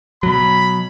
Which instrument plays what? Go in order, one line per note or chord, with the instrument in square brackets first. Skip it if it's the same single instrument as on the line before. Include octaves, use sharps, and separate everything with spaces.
[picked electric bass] B2 F#3 [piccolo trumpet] B5